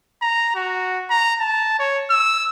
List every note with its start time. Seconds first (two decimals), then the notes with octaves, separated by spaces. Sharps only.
0.22 A#5
0.55 F#4
1.10 A#5
1.40 A5
1.79 C#5
2.10 E6